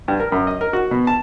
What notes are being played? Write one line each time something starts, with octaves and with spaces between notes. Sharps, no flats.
G2
A#4
F#2
D#5
A#4
F#4
B2
A5